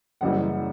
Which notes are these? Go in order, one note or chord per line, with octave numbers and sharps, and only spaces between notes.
F#1 F#2 E3 G3 F#5